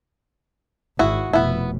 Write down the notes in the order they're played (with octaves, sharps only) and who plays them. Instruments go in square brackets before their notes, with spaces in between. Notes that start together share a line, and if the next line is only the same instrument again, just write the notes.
[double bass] G#1 [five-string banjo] E4 F#4 G#4
[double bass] F1 B2 [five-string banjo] B3 E4